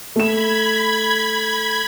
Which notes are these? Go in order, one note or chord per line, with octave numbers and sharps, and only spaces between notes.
A3 B5 G#6 E7